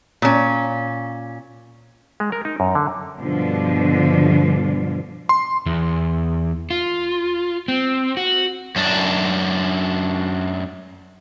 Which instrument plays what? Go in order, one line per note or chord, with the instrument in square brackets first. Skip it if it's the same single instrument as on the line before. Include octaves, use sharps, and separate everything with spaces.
[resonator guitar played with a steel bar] A#2 C#4
[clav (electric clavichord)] G#3
A#4
D#4
F#2
D3
[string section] G2 B2 D3 F3
[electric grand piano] C6
[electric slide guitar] E2
F4
C4
F#4
[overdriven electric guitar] F#2 D4